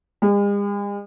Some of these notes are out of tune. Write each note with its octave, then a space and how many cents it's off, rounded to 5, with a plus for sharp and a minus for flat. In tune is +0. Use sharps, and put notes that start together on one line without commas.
G#3 -45